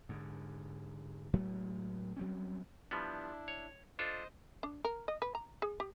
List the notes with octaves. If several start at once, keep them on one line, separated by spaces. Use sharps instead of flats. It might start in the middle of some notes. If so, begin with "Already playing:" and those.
G#2 D3
A2 F#3 G#3 A3
F#3 G3 C4 C#4
F3 G3 B3 D4 E4
C#5
D4 F4 A4 C5 D#5
D4
A#4
D#5
B4
A#5
G#4
G4